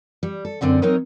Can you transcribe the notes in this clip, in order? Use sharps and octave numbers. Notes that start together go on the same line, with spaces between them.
G3
A4
F#2 D3 C4 D5 F#5
F#3 C4 D#4 A#4 C#5 D#5